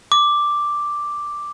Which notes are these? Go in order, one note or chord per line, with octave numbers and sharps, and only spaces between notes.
D6